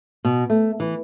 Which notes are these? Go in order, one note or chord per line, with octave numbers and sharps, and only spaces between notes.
B2
A3
E3